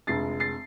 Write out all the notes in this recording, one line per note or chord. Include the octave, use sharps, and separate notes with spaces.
F1 F2 D3 G#3 A6 C7
A6 C7